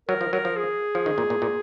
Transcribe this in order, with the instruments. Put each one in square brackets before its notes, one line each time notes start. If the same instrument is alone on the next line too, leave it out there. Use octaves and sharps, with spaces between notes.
[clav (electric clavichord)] F#3 [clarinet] A#4
[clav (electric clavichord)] F3
[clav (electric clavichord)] F#3 [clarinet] A#4
[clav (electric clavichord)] F3
[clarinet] G#4
[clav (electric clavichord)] F3
D#3
A#2
A#2
A#2